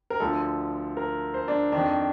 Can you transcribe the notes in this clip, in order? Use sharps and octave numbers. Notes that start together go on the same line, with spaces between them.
A#4
D2 D3 F3 A4
A#4
C5
D4
F2 D#3 D4